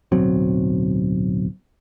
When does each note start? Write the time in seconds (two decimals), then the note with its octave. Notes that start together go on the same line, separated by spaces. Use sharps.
0.12 D1 B1 F#3 C4